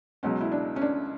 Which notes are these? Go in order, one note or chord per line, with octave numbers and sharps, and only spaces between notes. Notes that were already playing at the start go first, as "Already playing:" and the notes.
C#2 B2 F#3 C#4
E4
D4
C#4
D4